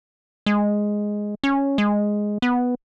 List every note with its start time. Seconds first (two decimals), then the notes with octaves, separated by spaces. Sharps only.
0.46 G#3
1.44 C#4
1.78 G#3
2.42 B3